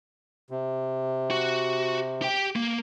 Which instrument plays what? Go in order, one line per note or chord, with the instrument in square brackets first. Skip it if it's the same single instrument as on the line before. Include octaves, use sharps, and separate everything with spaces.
[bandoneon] C3
[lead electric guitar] F#4
G4 G5
A#3